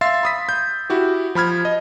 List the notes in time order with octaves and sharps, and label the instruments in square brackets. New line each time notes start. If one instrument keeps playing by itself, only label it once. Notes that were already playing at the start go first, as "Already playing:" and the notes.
[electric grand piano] E5 F5 C6 E6 A6 C7
B5 D#6 B6
G6
E4 F#4 G4
F3 B5 F6 G#6
D#5